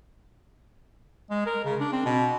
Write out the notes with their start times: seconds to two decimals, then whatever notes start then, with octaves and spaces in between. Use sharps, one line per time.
1.30 G#3
1.46 A#4
1.65 C#3
1.80 D4
1.93 C4
2.05 B2